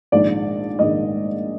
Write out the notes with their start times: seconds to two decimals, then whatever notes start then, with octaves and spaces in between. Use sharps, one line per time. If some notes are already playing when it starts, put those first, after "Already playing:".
0.12 A#1 G#2 D#3 G#3 D5
0.79 A#1 G#2 D#3 G#3 D#5